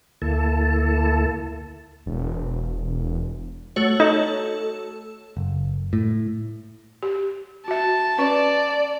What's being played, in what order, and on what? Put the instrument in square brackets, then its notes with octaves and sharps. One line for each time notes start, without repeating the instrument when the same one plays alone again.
[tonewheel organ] D2 A#3 E4 A4 A5
[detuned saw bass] E1
[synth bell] A3 F#4 C#5
[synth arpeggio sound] D#4 [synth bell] A4
[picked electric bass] F#1
A2
[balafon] G4
[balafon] F#4 E5 [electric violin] A5
[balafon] C#4 B4 C#6 [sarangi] D5